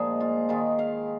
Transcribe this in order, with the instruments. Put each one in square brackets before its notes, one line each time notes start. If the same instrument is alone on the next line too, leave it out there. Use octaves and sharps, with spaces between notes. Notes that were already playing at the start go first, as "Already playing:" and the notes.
Already playing: [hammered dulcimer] A#2 F3 G#3 A#3 D#4 G#4 A#4
F4
D#3 G#3 F4
F5